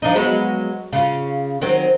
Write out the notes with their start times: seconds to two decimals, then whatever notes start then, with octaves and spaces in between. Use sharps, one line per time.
0.02 F3 D4 D#4
0.15 F#3 G#3 B3
0.93 C#3 F4
1.61 D#3 F#3 C4